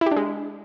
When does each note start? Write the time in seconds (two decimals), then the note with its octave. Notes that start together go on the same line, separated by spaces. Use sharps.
0.01 E4
0.06 G4
0.11 D4
0.16 G#3